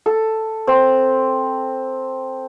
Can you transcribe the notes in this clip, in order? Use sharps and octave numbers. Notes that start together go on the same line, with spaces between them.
A4
C4